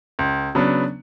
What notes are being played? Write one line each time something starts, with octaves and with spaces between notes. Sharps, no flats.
C#2
C#3 F#3 B3 D4